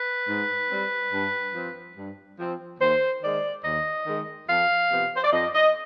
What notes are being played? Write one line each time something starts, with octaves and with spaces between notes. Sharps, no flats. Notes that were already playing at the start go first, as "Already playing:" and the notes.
Already playing: B4
G#2
G3 C4
G2
F3 C4
G2
F3 C4
D#2 C5
D#3 G#3 D5
D#2 D#5
D#3 G#3
F2 F5
C3 F3 B3
C5
D5
F2 D#5
D#5